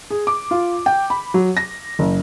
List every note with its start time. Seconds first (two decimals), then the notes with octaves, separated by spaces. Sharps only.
0.10 G#4
0.27 D6
0.51 F4
0.86 G5
1.10 B5
1.34 F#3
1.57 A#6
1.99 F#1